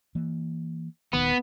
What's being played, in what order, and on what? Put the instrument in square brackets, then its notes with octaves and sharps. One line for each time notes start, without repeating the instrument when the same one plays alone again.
[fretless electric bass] E3 A#3
[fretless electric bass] D#1 B1 D#3 [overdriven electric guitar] B3